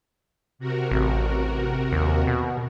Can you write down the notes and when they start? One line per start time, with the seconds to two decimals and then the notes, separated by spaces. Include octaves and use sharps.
0.59 C3 F#4 A#4
0.91 A1
1.92 D#2
2.27 B2